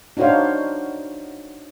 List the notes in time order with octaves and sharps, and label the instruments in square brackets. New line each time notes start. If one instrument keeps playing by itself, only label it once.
[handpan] D4 D#4 F#4 C5 C#5 F5